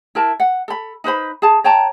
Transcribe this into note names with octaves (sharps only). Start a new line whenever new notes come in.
E4 A#4 A5
F#5
A4 B5
D#4 B4 C5 B5
G#4 A5
C#5 G5 A5 A#5